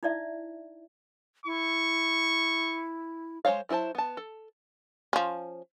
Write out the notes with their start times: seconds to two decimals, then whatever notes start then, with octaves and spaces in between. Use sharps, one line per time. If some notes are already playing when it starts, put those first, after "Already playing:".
0.03 D#4 E4 D5 E5
1.46 E4 C#6
3.45 G#3 D#4 C5 C#5 F5
3.69 F#3 E4 A#4 C5 A5
3.95 B3 A5
4.17 A4
5.13 F3 C#4